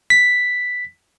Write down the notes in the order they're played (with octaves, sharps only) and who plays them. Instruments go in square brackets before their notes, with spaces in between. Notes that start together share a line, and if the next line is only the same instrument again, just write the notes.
[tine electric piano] B6